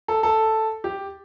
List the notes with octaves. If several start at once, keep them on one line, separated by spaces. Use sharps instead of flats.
A4
A4
G4